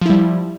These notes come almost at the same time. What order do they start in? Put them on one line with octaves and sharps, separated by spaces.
F3 E4 G3